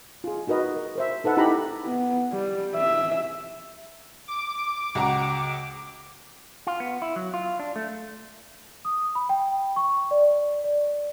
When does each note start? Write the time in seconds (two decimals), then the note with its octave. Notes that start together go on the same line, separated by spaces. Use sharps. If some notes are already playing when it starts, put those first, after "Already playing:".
0.24 F4 G#4
0.47 D#4 F#4 A#4 B4 D#5
0.76 A#4
0.95 A#4 C5 E5
1.24 D#4 A4 B4 F#5
1.37 D#4 E4 G4 A#5 B5
1.86 B3
2.33 G3
2.76 E5
4.27 D6
4.95 C#2 F#4 A#5
6.67 F4
6.80 B3
7.02 E4
7.16 F#3
7.34 F4
7.59 D4
7.76 A3
8.85 D#6
9.15 B5
9.29 G5
9.76 C#6
10.11 D5
10.64 D5